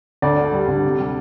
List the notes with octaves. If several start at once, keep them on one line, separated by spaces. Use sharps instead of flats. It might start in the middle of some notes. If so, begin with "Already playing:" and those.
D2 D5
D3
G3
D2
C3
G3